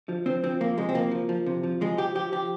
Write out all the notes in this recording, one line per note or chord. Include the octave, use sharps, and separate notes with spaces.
F3
F3 C4
F3 C4
F3 A#3
C3 G#3
C4
F3 A#3
F3
F3
C3
F3
F3 G#3
F3 G4
F3 G4
F3 G4